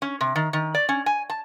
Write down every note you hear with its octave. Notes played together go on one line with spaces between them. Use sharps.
C#4
C3
D#3
D#3
D5
C#4
G#5
A5